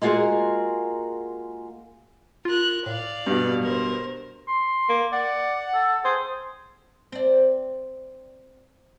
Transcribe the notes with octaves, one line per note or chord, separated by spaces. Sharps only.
G#3 A#3 F4 F#4 G#4 A#4
F4 A#4 F#6
A2 D5 F5
G2 B2
E1 A#4 C5
C6
A#3
D5 F#5
A4
G#4 C5
C4 D5